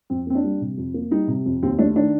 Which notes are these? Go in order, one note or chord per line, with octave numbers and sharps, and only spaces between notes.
F2 C4
A#3 C4
D4
G3
C3
F2
A#3
G3 D#4
C3
F2
D#2 C4
A3 D4
D#3 D4